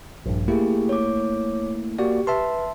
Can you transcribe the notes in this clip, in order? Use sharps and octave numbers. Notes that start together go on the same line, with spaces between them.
A#1 G2
A3 A#3 E4 G4 G#4
C#5 D6
A#3 F#4 G4 D5
B4 E5 A5 C6